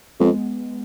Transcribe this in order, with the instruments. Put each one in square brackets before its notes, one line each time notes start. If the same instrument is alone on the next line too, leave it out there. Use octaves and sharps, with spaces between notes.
[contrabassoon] F2 [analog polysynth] G#3 B3